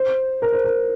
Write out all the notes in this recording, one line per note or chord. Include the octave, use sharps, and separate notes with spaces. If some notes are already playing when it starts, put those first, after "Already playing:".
Already playing: C5
A#4
C5
A#4